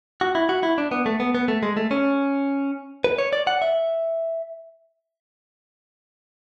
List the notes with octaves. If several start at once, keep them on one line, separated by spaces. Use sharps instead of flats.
F#4
E4
F#4
E4
D4
B3
A3
B3
B3
A3
G#3
A3
C#4
B4
C#5
D5
F#5
E5